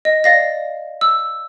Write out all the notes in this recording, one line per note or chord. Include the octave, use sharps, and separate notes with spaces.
D#5
D5 F5 A#6
E6